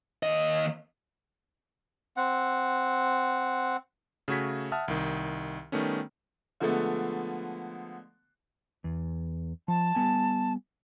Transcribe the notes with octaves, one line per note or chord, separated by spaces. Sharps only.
D#2 D#5
C4 F#5
C#3 A3 F#4 G#6 B6
E5 F#5 A5 D#6 F6
C2 D#3
D#3 G3 A3 B3 C#4
D3 F3 G#3 A3 B3
E2
F3 A5
G3 B3 G#5